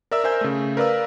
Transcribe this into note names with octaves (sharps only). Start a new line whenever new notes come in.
A#4 D5 E5 E6
A#4 C5 E5 G#5 E6 G6
C#3 A3
A#4 B4 D5 F5 E6